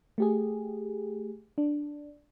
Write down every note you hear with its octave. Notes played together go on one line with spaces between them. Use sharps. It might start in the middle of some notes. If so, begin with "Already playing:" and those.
A3 G4 G#4
D4